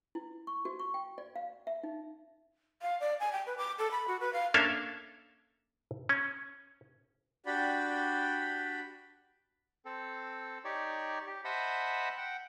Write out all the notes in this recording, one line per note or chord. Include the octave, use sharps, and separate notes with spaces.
E4
C#6
F#4
C#6
G5
D5
F5
E5
D#4
F5
D5
G#5
G5
B4
D6
A4
B5
F#4
B4
F5
A#3 C#4 D4 A4 E5 F5
C#4
D4 F#4 G4 D5 G5 B5
C4 A4
D#4 G4 C#5 D5
G4
C5 D#5 E5 F#5 A5 B5
F#5 G5